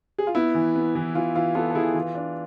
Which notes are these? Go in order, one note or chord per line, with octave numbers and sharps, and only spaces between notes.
G#4
F4
B3 E4
E3
B3
E3
E3 F4
E3 F4
B3 F4 A4
A4
E3 E4 G#4
E3 F4
D4